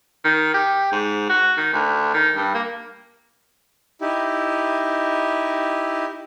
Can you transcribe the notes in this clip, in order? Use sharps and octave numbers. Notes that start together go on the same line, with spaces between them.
D#3
G4
G#2
F#4
D#3
D2
D#3
G2
A#3
D#4 E4 G4